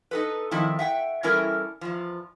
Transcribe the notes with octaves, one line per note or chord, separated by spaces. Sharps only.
D#4 A4 B4
D#3 F3 C4 E4
E5 F#5 G5
E3 G3 C#4 E4 A4 A#4
E2 F3